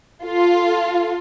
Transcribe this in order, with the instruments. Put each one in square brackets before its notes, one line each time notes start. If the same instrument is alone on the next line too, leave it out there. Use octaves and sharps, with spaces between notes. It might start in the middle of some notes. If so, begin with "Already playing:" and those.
[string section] F4 A4